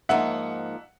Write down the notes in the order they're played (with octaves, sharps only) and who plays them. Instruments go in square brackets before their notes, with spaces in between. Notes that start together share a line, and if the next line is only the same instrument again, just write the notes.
[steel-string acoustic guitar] G#2 F3 A#3 D#4 [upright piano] E5 F#5